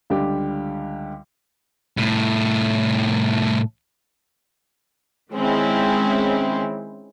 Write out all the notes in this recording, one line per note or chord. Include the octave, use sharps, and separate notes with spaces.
C#2 D3 G3 G4
C2 A2
D#3 G#3 C4 C#4 E4